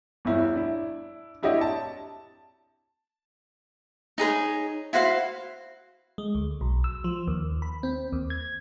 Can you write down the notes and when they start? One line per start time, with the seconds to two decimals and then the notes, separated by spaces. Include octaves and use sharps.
0.25 G1 E2 E4
0.53 D4 E4
1.43 D4 E4 G4 C#5 D#5
1.61 A5
4.18 D#4 G#4 B4 C#5
4.93 E4 F#4 C5 F5
6.18 G#3
6.35 D2
6.61 B1
6.84 E6
7.04 F3
7.28 D#2
7.62 B5
7.83 C4
8.13 D#2
8.30 G#6